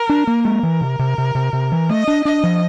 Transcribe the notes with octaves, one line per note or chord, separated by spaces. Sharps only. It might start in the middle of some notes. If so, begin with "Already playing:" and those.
Already playing: A#4
D4
A#3
G#3 A#4
E3
C3
C3
C3
C3
C3
E3
A3 D#5
D4
D4 D#5
F3